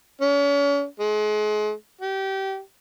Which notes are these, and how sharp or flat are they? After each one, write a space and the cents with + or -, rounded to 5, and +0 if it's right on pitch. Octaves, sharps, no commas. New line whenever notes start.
C#4 +40
G#3 +35
G4 -25